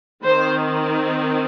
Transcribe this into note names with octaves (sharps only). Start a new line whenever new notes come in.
D#3 C4 C5